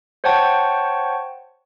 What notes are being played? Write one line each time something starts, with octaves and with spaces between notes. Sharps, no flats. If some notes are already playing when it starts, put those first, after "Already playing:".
C5 C#5 F#5 G5 A5 C#6